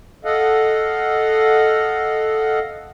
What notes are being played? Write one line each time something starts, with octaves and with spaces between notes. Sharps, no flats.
A4 D#5 F5 F#5